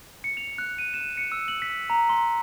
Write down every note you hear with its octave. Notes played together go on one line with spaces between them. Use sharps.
C#7
F7
F#6
D#7
E7
C#7
E6
F#7
B6
A#5
C6